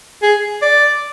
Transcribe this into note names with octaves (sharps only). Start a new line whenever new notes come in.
G#4
D5